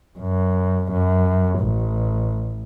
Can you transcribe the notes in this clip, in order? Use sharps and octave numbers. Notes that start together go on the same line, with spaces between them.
F#2
F#2
A1